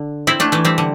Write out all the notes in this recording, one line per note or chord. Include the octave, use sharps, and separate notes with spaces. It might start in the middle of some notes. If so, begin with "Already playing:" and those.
Already playing: D3
C4 E4
A3 D4
E3 A3
G3 C4
D3